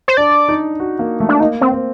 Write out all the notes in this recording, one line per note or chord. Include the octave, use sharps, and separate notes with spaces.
C5
D4 D5
D#4
F#4
A#3
A3
D4
A#3 D#4
C4
C4